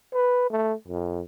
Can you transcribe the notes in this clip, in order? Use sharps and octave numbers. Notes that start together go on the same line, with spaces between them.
B4
A3
F2